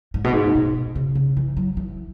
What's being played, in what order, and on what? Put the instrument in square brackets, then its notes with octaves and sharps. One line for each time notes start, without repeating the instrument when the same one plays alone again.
[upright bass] G#2
B2
G#2
B2
C#3
C#3
E3
F#3
E3